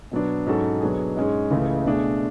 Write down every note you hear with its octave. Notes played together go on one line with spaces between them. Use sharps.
B2 F#3 B3 D4
G#2 F#3 C#4 F#4 A4
B2 F#3 B3 D4 G#4
G#2 G#3 C#4 G#4
C#2 C#3 E3 A3
B2 A3 D4 G#4